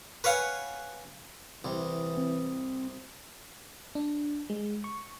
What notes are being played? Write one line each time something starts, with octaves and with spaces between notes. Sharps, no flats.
B4 C#5 F5 F#5 G#5
C2 E3
C4
D4
G#3
C#6